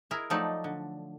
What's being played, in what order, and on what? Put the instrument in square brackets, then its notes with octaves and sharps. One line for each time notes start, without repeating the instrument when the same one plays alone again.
[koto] E4 G#4 A#4
F3 F#3 A3 D#4 D5
D3